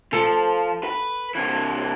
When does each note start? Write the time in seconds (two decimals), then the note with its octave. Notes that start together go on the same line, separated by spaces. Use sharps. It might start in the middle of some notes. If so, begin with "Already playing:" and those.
0.13 F3 A4
0.84 B4
1.35 C3 E3